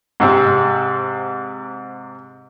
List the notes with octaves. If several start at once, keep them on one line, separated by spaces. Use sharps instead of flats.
G#2 C3 C4